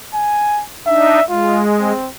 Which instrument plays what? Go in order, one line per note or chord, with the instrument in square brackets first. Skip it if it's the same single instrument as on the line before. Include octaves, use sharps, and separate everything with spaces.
[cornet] G#5
[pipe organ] D4 D#4 [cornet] E5
[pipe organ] G#3 [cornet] F4
[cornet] C4